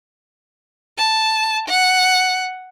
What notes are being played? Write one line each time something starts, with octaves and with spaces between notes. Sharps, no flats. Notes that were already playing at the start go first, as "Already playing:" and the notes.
A5
F#5